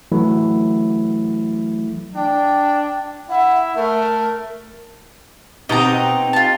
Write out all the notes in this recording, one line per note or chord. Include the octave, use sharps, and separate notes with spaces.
E3 F#3 A3 E4
D4 G5
E4 E5 F#5
A3 A#4
B2 C4 D#4 G4 D#5 A#5
F4 A5